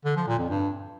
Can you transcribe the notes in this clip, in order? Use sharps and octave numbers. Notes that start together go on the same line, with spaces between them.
D3
F3
A#2
F2
G2